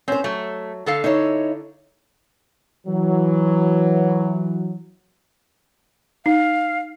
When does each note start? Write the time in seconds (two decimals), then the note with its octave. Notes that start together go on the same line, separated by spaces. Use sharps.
0.08 C4 C#4 C5
0.24 F#3 A3
0.86 D3 A4 F5
1.04 D#4 E4 C#5
2.87 E3 F#3
6.26 D#4 F5